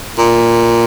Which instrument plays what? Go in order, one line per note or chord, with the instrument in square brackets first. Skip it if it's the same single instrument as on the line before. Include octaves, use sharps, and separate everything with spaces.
[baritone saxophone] A#2